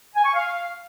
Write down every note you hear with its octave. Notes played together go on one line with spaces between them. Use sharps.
G#5
C#6
F5